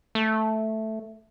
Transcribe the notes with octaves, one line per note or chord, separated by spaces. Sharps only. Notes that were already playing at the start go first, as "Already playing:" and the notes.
A3